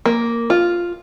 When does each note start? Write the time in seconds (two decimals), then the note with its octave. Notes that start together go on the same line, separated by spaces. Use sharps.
0.06 A#3
0.50 F4